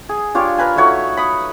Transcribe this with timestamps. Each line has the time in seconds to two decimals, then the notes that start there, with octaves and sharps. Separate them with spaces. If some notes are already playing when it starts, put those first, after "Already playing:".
0.09 G#4
0.34 D4 F4 G4 C#5
0.58 A#4 B4 G#5
0.76 A3 D#4 F#4 C#5
1.17 B5 D#6